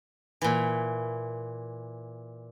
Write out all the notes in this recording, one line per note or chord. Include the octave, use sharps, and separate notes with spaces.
A#2 E3